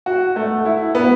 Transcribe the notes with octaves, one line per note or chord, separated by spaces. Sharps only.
F#4
A3
E4
B3